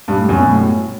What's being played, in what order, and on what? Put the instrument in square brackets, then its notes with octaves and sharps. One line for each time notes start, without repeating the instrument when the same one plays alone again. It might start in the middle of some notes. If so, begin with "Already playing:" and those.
[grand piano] G2
A2
F#2
B2
A2